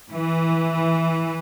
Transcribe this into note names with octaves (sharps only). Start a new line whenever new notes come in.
E3